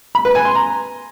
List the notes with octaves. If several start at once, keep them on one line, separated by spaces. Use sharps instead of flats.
B5
B4
G#5
C6
A#5